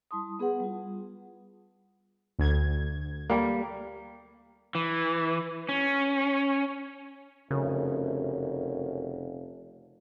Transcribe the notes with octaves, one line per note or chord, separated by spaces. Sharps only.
G3 E4 A5 C6 D#6
B3 G#4 B4 F#5
G3 F4
D2 G#6
G3 A#3
E3
C#4
F1 F#2 C#3